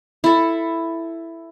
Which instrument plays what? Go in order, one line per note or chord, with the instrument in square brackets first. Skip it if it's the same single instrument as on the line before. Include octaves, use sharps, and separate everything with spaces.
[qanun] E4 A4